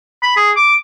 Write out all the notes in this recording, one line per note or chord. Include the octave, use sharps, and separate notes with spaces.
B5
G#4
D6